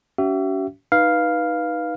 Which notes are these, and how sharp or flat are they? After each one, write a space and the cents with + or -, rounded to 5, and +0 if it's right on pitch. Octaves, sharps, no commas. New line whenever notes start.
C#4 +35 F#4 +45 E5 +30
D#4 +0 B4 -15 F5 +0